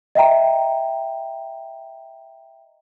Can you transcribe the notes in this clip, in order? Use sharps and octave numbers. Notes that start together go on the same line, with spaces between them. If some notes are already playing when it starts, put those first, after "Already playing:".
D#5 E5 G5 A#5